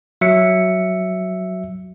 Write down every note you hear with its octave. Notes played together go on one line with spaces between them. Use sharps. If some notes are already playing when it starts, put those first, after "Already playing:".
F#3 E5 C#7